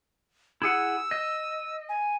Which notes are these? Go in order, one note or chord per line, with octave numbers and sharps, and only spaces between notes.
E4 G#4 F#5 E6
D#5
G#5